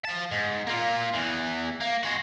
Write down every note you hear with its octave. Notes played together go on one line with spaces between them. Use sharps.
F3 A5
G#2
A#3 F4
E2 E3
A#3
G#3 F#4